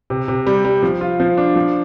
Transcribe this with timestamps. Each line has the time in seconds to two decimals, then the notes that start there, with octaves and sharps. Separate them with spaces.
0.10 C3
0.28 C3
0.47 G3
0.65 G3
0.83 F3
1.01 F4
1.20 F3
1.37 D4
1.56 F3